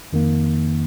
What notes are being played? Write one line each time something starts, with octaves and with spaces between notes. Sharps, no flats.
F2 D#3 A#3